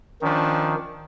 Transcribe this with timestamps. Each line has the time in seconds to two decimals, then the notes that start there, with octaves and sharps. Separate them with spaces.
0.21 D#3 F3 C#4 D4